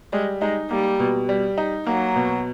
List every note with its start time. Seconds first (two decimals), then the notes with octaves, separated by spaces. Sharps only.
0.13 G3 G#3
0.41 G#3 D#4
0.70 G3 A#3
0.99 B2
1.29 G3
1.58 D#4
1.87 F#3 A#3
2.16 B2